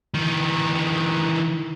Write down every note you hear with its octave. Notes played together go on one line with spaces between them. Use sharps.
D#3 E3